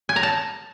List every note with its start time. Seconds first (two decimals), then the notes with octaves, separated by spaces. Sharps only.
0.09 G#5
0.16 A#5
0.23 A5